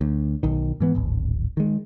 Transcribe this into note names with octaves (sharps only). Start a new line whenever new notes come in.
D2
B1 D#3
G#2 E3 B3
D1 G#1
D#3 G#3